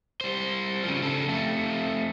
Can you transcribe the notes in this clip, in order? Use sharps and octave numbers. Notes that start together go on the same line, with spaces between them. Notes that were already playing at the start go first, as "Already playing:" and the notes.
G3 C5
C#3 F3
C#3 A4
F2 A3